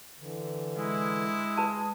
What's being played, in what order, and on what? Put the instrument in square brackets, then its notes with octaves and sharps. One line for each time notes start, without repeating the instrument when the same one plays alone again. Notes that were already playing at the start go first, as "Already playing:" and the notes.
[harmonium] D3 E3
[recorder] G#3 [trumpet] E4
[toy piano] B4 A5